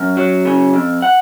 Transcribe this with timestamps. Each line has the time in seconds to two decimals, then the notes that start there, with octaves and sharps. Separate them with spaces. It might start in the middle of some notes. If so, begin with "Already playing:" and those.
Already playing: F#2
0.17 F#3
0.45 C#3
0.74 F2
1.02 F#5